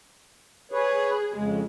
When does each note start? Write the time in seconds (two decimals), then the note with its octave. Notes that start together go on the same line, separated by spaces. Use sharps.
0.72 G#4 B4 C#5
1.35 F2 C#3 G#3